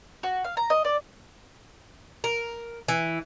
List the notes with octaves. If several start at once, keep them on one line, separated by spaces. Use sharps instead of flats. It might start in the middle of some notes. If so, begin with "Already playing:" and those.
F#4
F5
A#5
D#5
D5
A#4
E3